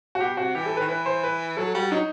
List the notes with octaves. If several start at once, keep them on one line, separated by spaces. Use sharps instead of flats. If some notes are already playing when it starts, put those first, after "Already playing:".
F#4
B2 G4
C3 F#4
E3 G4
A4
B4
D#3
E3 B4
C5
B4
F#3 A4
G3 F#4
F#3 D#4